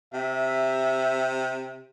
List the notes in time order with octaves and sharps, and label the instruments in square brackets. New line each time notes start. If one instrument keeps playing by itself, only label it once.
[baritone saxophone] C3 [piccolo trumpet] E5